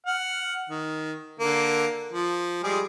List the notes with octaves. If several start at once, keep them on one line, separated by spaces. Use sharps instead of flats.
F#5 F6
D#3
D3 A#3
F3
G3 G#3 G#4